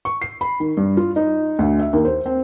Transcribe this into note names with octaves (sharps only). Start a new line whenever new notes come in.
C#6
C7
B5
D#3
G2
F4
D#4
D2
E5
D#2
C5
C4